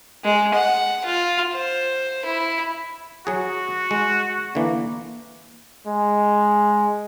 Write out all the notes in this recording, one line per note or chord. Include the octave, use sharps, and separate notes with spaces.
G#3
F#5
F4
C5
E4
F#3 F#4 G#4
G#3
D3 E3 A#3
G#3